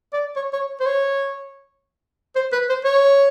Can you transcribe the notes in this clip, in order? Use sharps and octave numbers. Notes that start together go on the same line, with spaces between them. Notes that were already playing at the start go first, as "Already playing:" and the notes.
D5
C#5
C#5
C5
C#5
C5
B4
C5
C#5